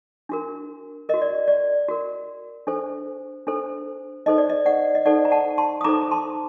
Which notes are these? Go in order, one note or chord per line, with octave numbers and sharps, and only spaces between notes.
D4 F#4 A#4
F#4 A#4 D#5
D5
D5
F#4 A#4
D4 A4 C5
D4 A4 C5
D#4 A4 C5 D#5
D5
D#5
D5 F#5
D#5
D#4 A4 C5 D5 F#5
A#5
F#5 A5
A5 C6
D#6
D#4 A4 C5 A#5 D6
A#5
A5 C6